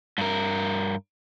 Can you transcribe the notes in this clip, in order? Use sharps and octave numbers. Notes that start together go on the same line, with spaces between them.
G2 A#4